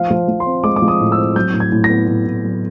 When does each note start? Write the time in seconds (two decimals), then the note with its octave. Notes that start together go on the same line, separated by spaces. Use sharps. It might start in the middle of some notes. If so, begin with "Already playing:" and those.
Already playing: F3 F5
0.11 F3
0.29 F3
0.40 C6
0.46 C4
0.63 G#3 D6
0.76 D6
0.82 F3
0.88 D#6
1.00 A2
1.12 E6
1.18 C4
1.36 F#3 G6
1.53 A2
1.60 G#6
1.72 A2
1.84 A#6
1.90 B3
2.08 A2
2.26 A2
2.44 F#3